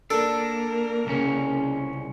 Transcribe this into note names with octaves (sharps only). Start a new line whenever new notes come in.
A#3 D4 A4 A#4
C2 C#3 C#4